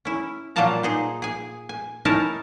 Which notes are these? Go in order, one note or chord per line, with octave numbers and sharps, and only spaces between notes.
C#4 E4
A#2 F#3 G3 A#3 A5 A#5
D#4 G#4 C5
G#4 G#5
G#5
C#4 D#4 E4 A#4 A5